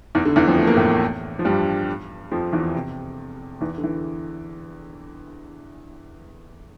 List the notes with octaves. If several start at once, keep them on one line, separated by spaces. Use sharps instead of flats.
E2 E3
D3
E2 E3
F2 F3
A3
A#3
A2 A3
F3
G2 G3
F2 F3
E2 E3
C3
E2 E3
D3
E3